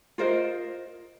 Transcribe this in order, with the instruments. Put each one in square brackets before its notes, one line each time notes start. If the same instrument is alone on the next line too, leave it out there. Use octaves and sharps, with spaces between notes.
[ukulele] F4 A#4 C5 D#5